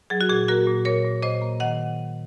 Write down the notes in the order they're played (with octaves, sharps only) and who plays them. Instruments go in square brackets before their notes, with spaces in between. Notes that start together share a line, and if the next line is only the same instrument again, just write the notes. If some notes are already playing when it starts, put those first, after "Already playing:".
[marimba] F#3 G#4
F#4
A#2 G#4
A#3 F#4 A#4
A#2
A#2 A#4 C#5
A#2
A#2 C5 D#5
A#3
D#3 D#5 F#5